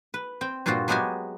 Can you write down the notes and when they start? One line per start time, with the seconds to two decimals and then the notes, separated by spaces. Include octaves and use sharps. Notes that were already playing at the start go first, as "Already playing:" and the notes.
0.14 B4
0.41 C4 G5
0.66 G2 A#2 C4 F4 F#4 C6
0.88 F#3 G#3 B3 F#4 G4 G#5